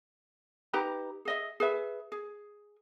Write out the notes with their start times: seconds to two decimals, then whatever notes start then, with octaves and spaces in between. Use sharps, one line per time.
0.73 D#4 G4 B4 A#5
1.25 G#4 D#5 E5
1.60 G#4 B4 E5
2.12 G#4